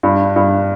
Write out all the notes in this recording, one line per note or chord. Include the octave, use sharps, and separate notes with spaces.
G2
G2